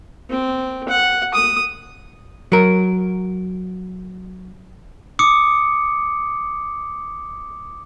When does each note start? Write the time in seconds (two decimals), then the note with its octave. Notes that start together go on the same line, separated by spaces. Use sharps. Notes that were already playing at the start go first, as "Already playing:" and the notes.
0.29 C4
0.89 F#5
1.34 D#6
2.52 F#3 A#4
5.19 D6 D#6 C#7